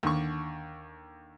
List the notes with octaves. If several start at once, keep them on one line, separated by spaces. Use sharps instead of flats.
D#2 D3 C#6